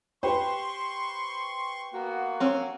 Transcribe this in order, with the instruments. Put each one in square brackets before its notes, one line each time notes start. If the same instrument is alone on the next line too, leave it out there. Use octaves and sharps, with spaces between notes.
[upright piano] G4 B4 C5 [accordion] C6 C#6
[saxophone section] A#3 F#4 [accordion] B3
[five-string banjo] C4 C#4